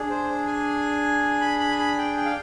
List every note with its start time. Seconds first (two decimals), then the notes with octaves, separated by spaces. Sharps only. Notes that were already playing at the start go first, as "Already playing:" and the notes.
Already playing: D4 G#4
0.10 C5
0.47 G#5
1.41 B5
1.59 B5
1.71 G#5
1.78 B5
1.98 G5
2.17 G5
2.25 F5